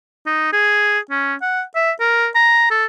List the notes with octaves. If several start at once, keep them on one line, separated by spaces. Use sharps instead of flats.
D#4
G#4
C#4
F#5
E5
A#4
A#5
A4